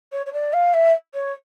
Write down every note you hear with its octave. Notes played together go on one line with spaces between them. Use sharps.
C#5
C#5
D5
F5
E5
C#5